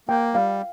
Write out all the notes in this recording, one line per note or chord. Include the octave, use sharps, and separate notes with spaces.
A#3 G5
G3 F5